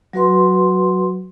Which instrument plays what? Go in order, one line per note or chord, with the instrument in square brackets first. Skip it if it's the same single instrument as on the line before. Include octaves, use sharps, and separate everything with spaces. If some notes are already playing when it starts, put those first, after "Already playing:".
[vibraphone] F#3 F#4 B4 C6